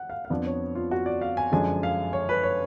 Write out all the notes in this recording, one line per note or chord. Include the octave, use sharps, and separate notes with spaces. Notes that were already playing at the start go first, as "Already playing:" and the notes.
Already playing: F#5
F5
F5
F2 F3 B3 D4 D5
C#5
F4
F#4
D5
F5
G#5
F#2 D3 F3 G#3 D4 G#5
F5
C#5
B4
C#5